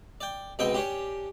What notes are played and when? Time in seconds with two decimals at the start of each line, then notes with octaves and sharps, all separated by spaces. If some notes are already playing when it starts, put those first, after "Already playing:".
0.21 D5 G5
0.59 C#2 B2 C4 D#5 G5
0.74 C#4 D4 G4